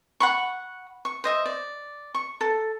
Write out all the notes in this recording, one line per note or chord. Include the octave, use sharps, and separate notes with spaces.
F#5 B5 C#6
C#6
C5 D#5 E5
D5
C#6
A4